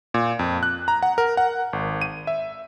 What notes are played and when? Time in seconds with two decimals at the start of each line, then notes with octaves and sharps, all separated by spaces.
0.14 A#2
0.39 F2
0.63 F#6
0.88 A#5
1.03 F#5
1.18 A#4
1.37 F#5
1.73 G#1
2.02 D#7
2.27 E5